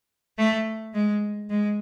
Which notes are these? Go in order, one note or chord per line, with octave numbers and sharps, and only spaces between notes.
A3
G#3
G#3